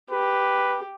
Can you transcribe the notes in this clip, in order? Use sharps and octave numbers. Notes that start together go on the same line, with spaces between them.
G4 B4